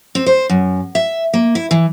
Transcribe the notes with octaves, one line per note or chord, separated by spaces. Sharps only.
C4
C5
F#2
E5
A#3
E4
E3